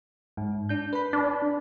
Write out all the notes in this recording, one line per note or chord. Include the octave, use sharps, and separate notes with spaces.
G#2
D4 G6
B4 B5
D4